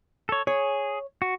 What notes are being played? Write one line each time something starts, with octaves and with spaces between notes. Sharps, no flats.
A4 C#5
G#4 C#5
F#4